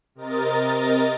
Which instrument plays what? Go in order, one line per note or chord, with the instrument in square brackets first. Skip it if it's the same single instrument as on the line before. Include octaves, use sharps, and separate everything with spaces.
[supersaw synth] C3 A#4 D#5 A6